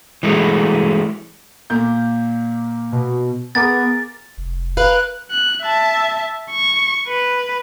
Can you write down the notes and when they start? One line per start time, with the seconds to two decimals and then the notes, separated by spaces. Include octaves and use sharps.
0.23 E3 G#3 A3
1.70 A#2 A#3 G6
2.92 B2
3.55 B3 G#4 A#4 D6 A6
4.37 F1
4.77 A#4 B4 F5 F#6
5.31 F#6
5.63 E5 A5
6.51 C#6
7.08 B4